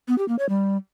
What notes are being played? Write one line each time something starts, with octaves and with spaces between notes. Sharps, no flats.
B3
G4
A#3
C#5
G3